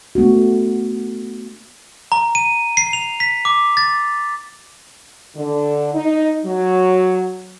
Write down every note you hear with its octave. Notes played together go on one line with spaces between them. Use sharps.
A3 B3 D4 F#4
A#5
D#7
C7
F7
B6
D6
A6
D3
D#4
F#3